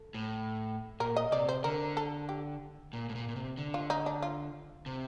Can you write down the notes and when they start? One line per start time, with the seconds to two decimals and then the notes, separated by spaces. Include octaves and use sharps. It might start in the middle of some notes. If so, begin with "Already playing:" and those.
Already playing: A4
0.14 A2
1.00 A#2 A#4
1.16 D#5
1.32 C3 D5
1.49 C5
1.64 D3 A#4
1.97 A4
2.29 G4
2.93 A#2
3.09 A2
3.15 A#2
3.28 A#2
3.36 C3
3.58 D3
3.74 F4
3.90 D#4
4.06 D4
4.22 F4
4.86 C3